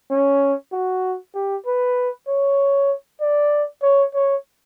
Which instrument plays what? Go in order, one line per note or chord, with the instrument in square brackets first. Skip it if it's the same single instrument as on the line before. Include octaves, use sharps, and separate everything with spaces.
[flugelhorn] C#4
F#4
G4
B4
C#5
D5
C#5
C#5